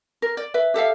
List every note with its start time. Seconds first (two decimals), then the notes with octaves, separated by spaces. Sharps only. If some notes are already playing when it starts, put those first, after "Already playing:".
0.22 A#4
0.37 D5
0.54 B4 E5
0.74 G4 A4 E5 F5